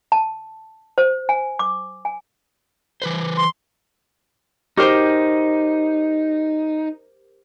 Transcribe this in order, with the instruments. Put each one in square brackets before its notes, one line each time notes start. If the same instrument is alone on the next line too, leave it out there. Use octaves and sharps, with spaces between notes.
[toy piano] A5
C5
G#5
D6
G#5
[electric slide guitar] E3 B4 C5
[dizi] C6
[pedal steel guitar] D#4 [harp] G4 A#4 C5